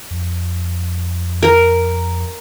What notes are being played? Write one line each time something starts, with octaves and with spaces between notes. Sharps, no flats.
F2
A#4